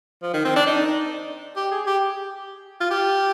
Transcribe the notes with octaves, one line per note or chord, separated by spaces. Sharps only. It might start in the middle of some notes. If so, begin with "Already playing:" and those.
F3
D#3
C4
D4
D#4
G4
G#4
G4
F4
G4